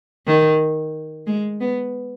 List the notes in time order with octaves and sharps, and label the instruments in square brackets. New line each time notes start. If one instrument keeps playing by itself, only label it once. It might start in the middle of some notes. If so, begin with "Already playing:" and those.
[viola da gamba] D#3
G#3
B3